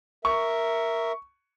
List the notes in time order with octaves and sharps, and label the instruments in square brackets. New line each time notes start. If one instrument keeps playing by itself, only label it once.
[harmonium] A#4 E5 [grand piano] C#6